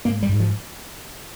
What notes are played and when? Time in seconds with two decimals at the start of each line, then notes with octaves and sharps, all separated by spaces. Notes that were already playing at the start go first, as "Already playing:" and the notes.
0.05 G#2 A#3
0.23 G3
0.29 G#2
0.40 F3